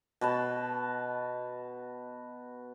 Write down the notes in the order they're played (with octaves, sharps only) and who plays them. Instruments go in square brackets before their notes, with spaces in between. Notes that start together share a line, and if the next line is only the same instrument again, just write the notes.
[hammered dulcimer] B2 B4 A5